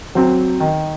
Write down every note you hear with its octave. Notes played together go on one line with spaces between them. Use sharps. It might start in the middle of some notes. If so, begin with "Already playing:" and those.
F#3 C4
D#3